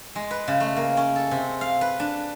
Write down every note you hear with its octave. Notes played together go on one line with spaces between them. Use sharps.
G#3
B4
C#3
A3
A#3
C#4
A4
C3
F5
B4
D4